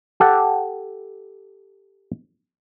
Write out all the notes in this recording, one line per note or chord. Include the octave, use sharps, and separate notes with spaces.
G4 A4 F#5